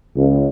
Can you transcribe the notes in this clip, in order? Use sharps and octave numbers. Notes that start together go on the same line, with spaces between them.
C#2